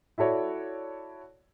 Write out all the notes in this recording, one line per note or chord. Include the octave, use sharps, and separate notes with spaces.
E4 F#4 A4 C#5 D5